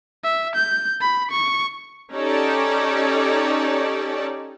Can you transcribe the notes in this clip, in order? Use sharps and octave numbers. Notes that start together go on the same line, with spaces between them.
E5
G6
B5
C#6
C#4 D#4 G4 A4 D5